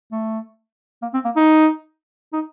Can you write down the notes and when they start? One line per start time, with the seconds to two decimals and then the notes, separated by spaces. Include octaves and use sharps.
0.12 A3
1.02 A#3
1.14 C4
1.25 A#3
1.36 D#4
2.33 D#4